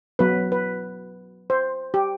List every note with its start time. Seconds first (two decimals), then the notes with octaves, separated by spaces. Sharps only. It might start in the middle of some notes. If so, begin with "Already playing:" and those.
0.19 F#3 B3 B4
0.52 B4
1.50 C5
1.94 G4